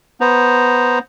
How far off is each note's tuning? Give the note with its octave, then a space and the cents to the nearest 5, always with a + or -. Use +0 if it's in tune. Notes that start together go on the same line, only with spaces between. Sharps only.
B3 +0 C5 +0 A#5 +0